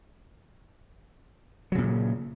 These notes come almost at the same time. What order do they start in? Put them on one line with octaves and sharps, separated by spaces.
F#3 C#3 A#2